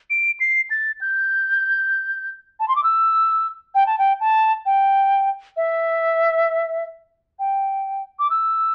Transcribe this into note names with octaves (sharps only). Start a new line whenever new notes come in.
D7
C7
A6
G6
A5
C6
D6
E6
G5
A5
G5
A5
G5
E5
G5
D6
E6